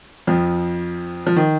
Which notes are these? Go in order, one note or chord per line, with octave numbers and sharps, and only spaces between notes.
F2 F3
F3
D#3